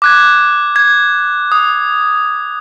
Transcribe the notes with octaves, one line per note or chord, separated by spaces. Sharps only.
D6 F#6 G#6
G#6
D#6